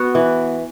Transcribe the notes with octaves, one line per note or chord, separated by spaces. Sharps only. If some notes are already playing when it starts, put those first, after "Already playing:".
Already playing: B3 F#4
E3